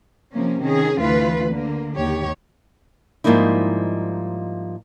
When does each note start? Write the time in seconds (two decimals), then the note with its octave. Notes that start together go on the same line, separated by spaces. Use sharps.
0.32 C3 F3 A#3 C#4
0.62 D#3 C#4 G#4
0.97 D2 E3 F4 B4
1.51 D3 A#3
1.97 D#2 G4 C#5
3.24 G#2 F3 G3 A#3 D#4 E4